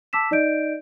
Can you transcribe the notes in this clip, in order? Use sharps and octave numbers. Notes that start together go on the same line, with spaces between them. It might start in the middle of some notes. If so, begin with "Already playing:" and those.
A5 D6 E6 B6 E7
D#4 D5 D#5 G6 D7